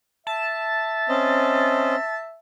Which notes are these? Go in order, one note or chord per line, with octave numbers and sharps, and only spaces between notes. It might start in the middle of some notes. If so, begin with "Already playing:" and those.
E5 A5
C4 C#4 D#5